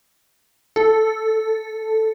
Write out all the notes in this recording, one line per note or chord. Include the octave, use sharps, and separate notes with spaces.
A4